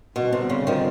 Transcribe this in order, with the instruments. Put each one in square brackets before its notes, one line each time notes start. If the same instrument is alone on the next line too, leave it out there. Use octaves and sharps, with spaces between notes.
[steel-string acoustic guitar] B2 [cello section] D3 G3 C4
[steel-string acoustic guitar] C3
C#3
D#3 F3